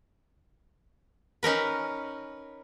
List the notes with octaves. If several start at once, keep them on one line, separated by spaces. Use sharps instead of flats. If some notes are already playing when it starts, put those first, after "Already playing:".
C#4 D#4 A#4 B4